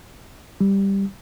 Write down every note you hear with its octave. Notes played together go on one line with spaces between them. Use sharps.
G3